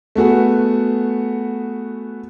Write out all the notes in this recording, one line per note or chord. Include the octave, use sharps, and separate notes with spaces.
A3 B3 F#4 G#4